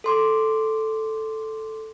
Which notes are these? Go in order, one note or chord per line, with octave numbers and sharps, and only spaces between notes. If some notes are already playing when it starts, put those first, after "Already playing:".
A4 C6 D6